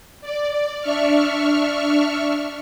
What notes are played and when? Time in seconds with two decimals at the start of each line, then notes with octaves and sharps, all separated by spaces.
0.21 D5
0.81 D4 E5 C#6 F6